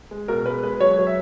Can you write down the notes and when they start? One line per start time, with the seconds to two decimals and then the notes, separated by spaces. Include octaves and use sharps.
0.11 G#3
0.28 B2 A#4
0.46 G#3 B4
0.63 G#3 B4
0.80 F#3 C#5
0.98 F#3
1.07 E5